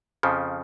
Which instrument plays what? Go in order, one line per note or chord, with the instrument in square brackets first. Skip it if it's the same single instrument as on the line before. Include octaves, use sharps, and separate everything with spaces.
[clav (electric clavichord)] F2 C#3 F3